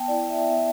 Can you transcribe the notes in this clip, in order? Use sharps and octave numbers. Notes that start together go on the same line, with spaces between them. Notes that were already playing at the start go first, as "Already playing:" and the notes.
Already playing: B3 G5 A5
E4 D5
E5
B3 E5